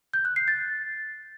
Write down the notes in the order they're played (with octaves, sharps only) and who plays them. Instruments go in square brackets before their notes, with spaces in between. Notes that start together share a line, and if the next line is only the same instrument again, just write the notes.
[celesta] G6
F#6
C7
A6